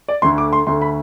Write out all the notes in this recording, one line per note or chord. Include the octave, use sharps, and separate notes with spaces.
D5
D2 D3 A3 C6
D6
C6
D2 D3 A3 C6
B5